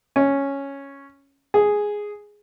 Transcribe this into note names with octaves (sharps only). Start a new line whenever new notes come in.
C#4
G#4